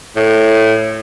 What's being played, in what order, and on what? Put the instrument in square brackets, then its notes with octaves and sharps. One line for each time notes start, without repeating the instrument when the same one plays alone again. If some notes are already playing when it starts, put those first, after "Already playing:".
[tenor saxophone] A2